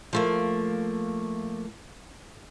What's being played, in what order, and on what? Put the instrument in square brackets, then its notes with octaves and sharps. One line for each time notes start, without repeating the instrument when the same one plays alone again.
[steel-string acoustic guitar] F3 A3 A#3